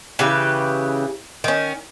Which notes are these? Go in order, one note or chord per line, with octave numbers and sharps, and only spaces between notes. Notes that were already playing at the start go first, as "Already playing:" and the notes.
C#3 E3 G4 B4
D#3 C#4